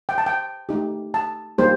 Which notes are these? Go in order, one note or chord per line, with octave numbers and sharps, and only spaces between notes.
G5
A5
G5
A3 D#4 G4
A5
G3 A#3 D#4 G4 C5